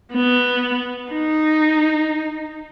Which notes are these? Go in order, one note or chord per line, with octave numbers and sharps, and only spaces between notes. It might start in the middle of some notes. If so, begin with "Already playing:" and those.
B3
D#4